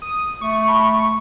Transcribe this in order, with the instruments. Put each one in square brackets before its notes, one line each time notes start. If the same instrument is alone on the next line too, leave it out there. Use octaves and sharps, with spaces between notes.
[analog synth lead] D#6
[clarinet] A3 [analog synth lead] C#6
[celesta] A5 B5 C6